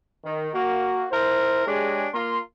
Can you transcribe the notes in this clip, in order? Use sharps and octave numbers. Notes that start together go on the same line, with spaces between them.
D#3
A#3 F#4
E4 A#4 C5
G#3 D4 G4 G#4 C#5
A#3 F4 A#5 C6